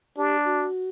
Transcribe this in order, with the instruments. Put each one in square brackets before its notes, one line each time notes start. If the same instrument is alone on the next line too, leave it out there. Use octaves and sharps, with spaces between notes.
[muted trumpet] D4 [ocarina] G4
[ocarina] F#4